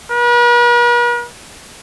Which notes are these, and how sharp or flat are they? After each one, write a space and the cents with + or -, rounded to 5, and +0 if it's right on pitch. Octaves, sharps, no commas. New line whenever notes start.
B4 -45